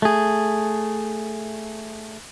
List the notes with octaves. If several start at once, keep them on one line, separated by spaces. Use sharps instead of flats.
A3 G#4